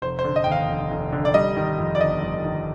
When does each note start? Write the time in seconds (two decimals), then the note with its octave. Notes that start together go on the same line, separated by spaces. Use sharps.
0.02 F1 C5
0.19 C5
0.24 D3
0.36 D#5
0.44 D#2 G5
0.52 F5
0.68 F1
0.91 F1
1.12 D3
1.25 D5
1.34 G3 D#5
1.57 D#3
1.78 F2
1.95 D5
2.00 G1 D#5
2.22 G3
2.45 D#3